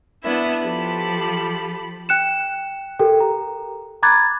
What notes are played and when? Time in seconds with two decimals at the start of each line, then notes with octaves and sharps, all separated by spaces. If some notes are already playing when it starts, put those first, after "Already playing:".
0.24 B3 D4 E4 E5
0.63 F3 G4 A4 B5
2.09 G5 F#6 C#7 E7
2.99 G4 A4 A#4 G5
3.20 A#5
4.03 A#5 B5 D6 F#6 G#6 A6